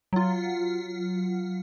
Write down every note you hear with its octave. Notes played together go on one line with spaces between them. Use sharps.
F#3 F4